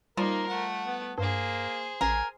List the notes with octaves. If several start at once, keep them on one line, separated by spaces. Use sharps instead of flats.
F3 G3 A#3 D#4 A#4
A3 F#5
B3
G2 A#3 G#4 C5
A1 A#4 G#5